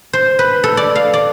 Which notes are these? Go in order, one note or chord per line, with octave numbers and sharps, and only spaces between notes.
C5
B4
A4
D5
F5
D5